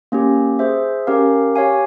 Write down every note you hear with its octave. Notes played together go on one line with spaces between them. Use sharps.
A#3 C#4 G4
G#4 C5 E5
C#4 G4 A#4 F5
G4 C#5 F5 G#5